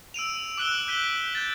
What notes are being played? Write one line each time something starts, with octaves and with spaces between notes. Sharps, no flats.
E6 D7 D#7 F7
D6 E6 F#6 D7 G7
F#6 G6 B6 D#7 G7
G6 A6